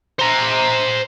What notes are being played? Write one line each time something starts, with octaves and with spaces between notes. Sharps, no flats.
C5 A#5